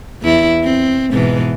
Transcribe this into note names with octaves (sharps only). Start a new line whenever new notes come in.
E2 E4
C4
G#2 B2 E3